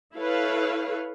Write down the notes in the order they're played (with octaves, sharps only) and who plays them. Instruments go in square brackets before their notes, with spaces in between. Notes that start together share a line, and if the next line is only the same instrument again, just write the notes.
[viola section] E4 A4 B4 C#5 F5